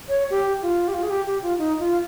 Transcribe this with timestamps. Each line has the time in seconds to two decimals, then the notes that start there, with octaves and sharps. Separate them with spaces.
0.08 C#5
0.30 G4
0.62 F4
0.88 G4
0.94 F4
1.03 G#4
1.10 G4
1.27 G4
1.43 F4
1.58 D#4
1.80 F4